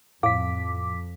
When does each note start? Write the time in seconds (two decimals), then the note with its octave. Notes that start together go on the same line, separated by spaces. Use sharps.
0.23 F2 A2 F5 D6 B6